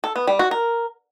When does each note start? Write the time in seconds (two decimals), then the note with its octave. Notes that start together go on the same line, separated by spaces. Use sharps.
0.04 A4
0.16 B3
0.27 G3
0.39 F#4
0.51 A#4